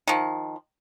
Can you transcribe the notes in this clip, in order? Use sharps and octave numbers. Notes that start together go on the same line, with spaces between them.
D#3 F3